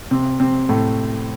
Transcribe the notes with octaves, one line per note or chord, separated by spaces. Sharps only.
C3 C4
C3 C4
A2 A3